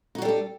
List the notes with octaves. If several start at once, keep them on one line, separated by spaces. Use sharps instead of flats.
G3 D4 D#4 F#4 A4